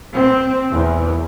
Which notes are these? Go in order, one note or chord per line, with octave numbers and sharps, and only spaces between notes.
C4
E2